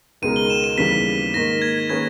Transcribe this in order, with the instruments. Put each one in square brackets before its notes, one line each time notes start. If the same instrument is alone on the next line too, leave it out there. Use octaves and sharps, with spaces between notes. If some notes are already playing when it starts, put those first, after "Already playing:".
[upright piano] C#2 B2 G#3 D#4 A#4 [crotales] D#7
[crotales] G7
E7
D#7
[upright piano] D#2 C#3 E3 G3 B3 [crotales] B6
[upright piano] G#2 D#3 A#3 D#4 A#4 [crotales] A#6
[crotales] G#6
[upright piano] D#3 A#3 C#4 G#4 B4 [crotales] G#6